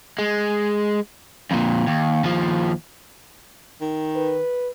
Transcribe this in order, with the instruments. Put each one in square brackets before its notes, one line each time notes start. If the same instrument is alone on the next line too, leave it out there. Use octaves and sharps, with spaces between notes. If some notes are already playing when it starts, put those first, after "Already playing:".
[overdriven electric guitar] G#3
F2 A#2
D#2
D#2 F3
[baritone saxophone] D#3
[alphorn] B4